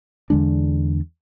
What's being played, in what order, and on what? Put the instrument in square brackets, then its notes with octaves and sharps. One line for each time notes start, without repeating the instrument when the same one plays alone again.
[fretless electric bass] E2 D3 G#3 D4